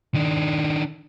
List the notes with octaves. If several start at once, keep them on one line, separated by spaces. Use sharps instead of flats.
D#3 D4